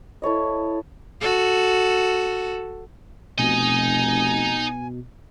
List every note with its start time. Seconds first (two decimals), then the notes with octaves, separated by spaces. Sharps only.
0.22 E4 A4 C#5 D#5
1.21 F#4 A4
3.38 F1 B2 D#4 D#5 G#5